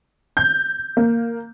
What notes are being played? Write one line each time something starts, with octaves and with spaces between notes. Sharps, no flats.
G6
A#3